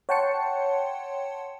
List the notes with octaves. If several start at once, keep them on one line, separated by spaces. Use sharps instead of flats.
C#5 F#5 G5 A5 C6 C#7